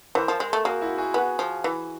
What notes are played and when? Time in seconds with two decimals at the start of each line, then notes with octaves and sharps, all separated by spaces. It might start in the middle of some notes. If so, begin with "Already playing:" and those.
0.15 E3 A#4 C5
0.28 F3
0.40 G#3
0.53 A3
0.65 A#3 F#4 G#4
0.81 E4 F#4
0.98 F#4 G#4
1.14 B3 F#4 G#4
1.39 F3
1.64 E3